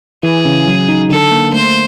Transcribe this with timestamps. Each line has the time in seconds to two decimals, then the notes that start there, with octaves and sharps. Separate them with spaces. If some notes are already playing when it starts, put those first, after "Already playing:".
0.23 E3 G#4
0.45 C#3
0.67 F#3
0.88 D#4
1.10 D3 A4
1.31 A#3
1.53 A3 C5